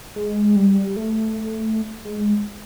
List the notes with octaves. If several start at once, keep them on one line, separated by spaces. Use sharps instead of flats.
G#3
G3
A3
G#3